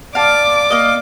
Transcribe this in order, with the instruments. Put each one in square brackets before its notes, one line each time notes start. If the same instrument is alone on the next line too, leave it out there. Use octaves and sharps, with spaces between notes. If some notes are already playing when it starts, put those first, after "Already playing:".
[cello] D5 [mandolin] F5 A5 [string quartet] D6
[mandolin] A#3 D#5